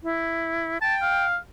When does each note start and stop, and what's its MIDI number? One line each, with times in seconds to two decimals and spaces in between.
0.03 0.78 64
0.82 1.25 79
0.82 0.95 81
1.02 1.37 77